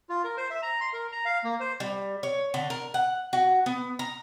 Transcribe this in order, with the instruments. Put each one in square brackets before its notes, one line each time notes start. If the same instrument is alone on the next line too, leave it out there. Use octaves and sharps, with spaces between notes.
[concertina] F4
A#4
C5
E5
A#5
C6
A#4
A#5
F5
A#3
C5
[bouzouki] G3
C#5
D3
A#4
F#5
F#4
B3
A#5